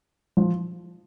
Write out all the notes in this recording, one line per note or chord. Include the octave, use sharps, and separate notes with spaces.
F3